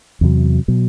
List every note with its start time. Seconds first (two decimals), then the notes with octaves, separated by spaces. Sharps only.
0.21 E2 C3 F#3
0.68 B2 F#3